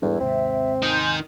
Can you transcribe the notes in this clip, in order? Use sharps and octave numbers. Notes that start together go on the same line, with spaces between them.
E2 G#2 G3 D4 E4 A4
D#2 G#2 C3 C4 E5
D#3 D#4 G#5 C6 G6